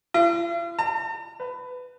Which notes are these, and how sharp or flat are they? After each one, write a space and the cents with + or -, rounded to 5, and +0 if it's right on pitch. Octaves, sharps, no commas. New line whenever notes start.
F4 -45
A#5 -45
B4 +15